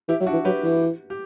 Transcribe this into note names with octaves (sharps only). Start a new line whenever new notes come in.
E3 E4 G4
F#3 E4
D4 F#4
E3
F#3 G4 B4
E3
G4